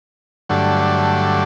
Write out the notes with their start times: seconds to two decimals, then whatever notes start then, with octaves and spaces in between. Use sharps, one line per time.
0.49 G2 D3 F#3 A3